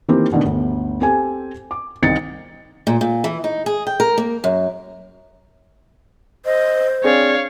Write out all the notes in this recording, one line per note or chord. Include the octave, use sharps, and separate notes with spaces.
D#3 E3 A#3 C4 G4
B2 D3 D#3 A3
G1 D2
C4 G4 A4 G#5
D6
C2 D#3 C4 D#4 A6 C#7
A#2
A#2
E3
D#4
G#4
G5
A#4
A#3
F#2
C5 D#5
C4 D4 G#4 C#5 D5 F5